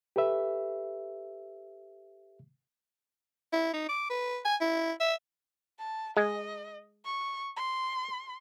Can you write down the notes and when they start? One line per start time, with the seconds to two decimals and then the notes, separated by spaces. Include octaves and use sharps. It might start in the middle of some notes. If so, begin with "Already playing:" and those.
0.16 G4 A4 B4 E5
3.53 E4
3.74 D#4
3.89 D6
4.10 B4
4.45 G#5
4.61 E4
5.00 E5
5.79 A5
6.17 G#3 D#5
7.05 C#6
7.57 C6